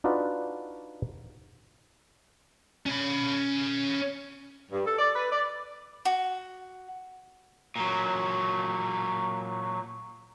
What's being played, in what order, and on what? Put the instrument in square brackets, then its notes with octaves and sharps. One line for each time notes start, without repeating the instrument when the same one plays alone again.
[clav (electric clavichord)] D4 D#4 F4 F#4 B4 D5
[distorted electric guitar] C#4 B5
[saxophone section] G2
A4
D5
B4
D5
[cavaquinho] F#4
[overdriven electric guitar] A#2 F#3